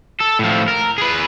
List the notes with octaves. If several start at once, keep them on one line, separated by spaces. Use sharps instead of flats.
A4
A2 F3
A#4
G#4 B4